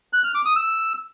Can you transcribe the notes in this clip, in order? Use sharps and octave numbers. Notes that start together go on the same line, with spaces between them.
F#6
F6
D6
D#6
E6